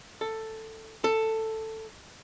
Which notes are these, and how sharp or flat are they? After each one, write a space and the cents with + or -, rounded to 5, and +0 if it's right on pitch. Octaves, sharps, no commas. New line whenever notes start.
A4 +10
A4 +10